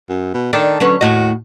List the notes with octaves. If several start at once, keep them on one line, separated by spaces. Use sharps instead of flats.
F#2
B2
D#3 D4 A4
D3 F#3 C#4 B4
D#2 A2 F#4 D#5